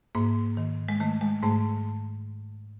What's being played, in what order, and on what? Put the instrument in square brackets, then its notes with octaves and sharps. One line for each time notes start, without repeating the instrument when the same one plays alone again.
[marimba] G#2 A#3
D#3
G#3
D#3 A3
G#3
G#2 A3